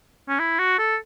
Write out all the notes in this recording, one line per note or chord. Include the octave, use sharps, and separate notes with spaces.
C#4
E4
F#4
A4